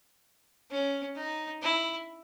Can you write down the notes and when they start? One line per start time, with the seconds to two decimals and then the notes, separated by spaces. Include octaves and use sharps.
0.71 C#4
1.16 D#4
1.62 E4